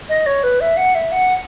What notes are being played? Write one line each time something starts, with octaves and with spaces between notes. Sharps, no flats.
D#5
C#5
B4
E5
F#5
E5
F#5